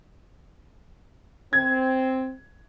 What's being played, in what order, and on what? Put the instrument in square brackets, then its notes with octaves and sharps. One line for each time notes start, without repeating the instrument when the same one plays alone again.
[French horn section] C4 [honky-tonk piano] G#6